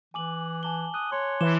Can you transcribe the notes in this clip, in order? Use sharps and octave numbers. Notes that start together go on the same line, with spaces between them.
E3 G#5 D6 F#7
G#5 A5 G7
D#6 F#6
C#5 C6
E3 D6 E7 G7